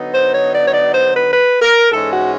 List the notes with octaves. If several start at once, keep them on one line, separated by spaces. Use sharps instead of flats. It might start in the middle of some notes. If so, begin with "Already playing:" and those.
Already playing: D3 F#3 B3 D#4
C5
C#5
D5
C#5
D5
C5
B4
B4
A#4
G#2 E3 G#3 C#4 A4
F#4